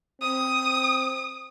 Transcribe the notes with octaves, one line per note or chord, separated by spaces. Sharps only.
C4 D#6